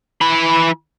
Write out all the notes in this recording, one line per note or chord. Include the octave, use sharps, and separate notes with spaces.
E3 B5